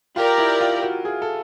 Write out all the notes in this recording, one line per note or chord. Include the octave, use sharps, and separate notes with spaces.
F4 G4 A#4 D5
E4
F4
F#4
G#4
A4